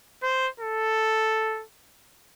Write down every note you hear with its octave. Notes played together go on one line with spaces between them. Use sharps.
C5
A4